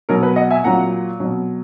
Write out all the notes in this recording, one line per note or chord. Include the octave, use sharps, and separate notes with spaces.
B2 F#3 A#4
B4
D#5 F#5
E5 G#5
A#2 F#3 F#5 A#5
B2 F#3